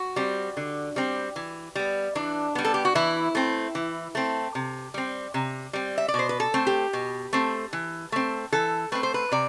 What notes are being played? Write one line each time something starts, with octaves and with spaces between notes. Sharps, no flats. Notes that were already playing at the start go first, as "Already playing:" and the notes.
Already playing: F#4
G3 C4
D3
G3 C4
E3
G3 B3
E3 D4
G3 B3
A4
G4
F#4
E3 E4
A3 C4
E3
A3 C4
C3
G3 C4
C3
G3 C4
E5
D5
B2
C5
B4
A4
A3 C4
G4
B2
A3 C4
E3
A3 C4
E3 A4
A3 C4 B4
C5
B4
C3 D5